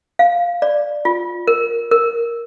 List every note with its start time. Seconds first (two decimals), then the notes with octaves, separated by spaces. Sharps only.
0.19 F5
0.62 D5
1.05 F4
1.47 A#4
1.91 A#4